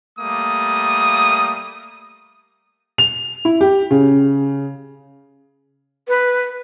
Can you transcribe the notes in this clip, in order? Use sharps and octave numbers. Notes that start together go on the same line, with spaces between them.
G3 A3 A#3 D#6
F7
E4
G4
C#3
B4